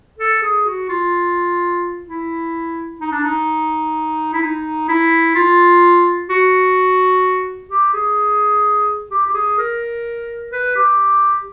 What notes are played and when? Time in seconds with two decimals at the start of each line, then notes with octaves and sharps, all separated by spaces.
0.19 A4
0.42 G#4
0.66 F#4
0.89 F4
2.06 E4
3.00 D#4
3.12 D4
3.24 D#4
4.33 E4
4.42 D#4
4.88 E4
5.35 F4
6.29 F#4
7.70 G4
7.93 G#4
9.11 G4
9.26 G4
9.34 G#4
9.58 A#4
10.52 B4
10.75 G4